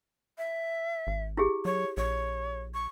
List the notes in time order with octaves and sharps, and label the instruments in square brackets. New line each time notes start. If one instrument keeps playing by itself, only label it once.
[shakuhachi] E5
[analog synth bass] G#1
[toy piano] E4 G4 G#4
[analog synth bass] F#3 [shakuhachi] C#5
[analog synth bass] A#1 [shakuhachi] C#5
[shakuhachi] C#6